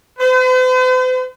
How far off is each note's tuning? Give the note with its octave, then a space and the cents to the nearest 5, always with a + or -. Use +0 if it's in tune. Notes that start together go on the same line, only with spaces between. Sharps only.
C5 -45